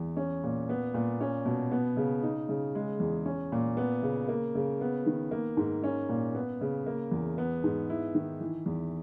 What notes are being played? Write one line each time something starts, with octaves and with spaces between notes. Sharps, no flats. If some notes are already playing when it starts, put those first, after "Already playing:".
Already playing: E2
C#4
A#2
B3
A#2
C#4
B2
B3
C#3
D#4
C#3
G#3
E2
C#4
A#2
B3
C#3
A#3
C#3
B3
D#3
A#3
G#2
C#4
A#2
B3
C#3
A#3
E2
B3
G#2
E4
D#3
E3
E2